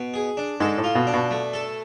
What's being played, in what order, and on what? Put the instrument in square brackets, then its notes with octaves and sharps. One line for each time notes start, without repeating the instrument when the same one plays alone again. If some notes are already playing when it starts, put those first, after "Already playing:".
Already playing: [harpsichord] B2
G#4
D4
[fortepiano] G#2 G#3 [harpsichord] A4
[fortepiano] A2
[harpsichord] F4
[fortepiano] B2
[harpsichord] D4
[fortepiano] B2
[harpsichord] A3
A4